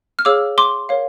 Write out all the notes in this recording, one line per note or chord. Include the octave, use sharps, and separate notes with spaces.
F6
G#4 C#5 F5 D6 E6
C6 D6
A#4 C#5 F5